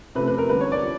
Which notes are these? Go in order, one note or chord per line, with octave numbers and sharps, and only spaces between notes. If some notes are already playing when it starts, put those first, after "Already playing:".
C3 F3 A3 B4
B4
A#4
D3 G3 A#3 B4
C#5
D5
F3